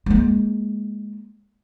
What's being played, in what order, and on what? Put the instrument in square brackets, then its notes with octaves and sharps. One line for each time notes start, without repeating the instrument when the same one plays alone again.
[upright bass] G#3 A#3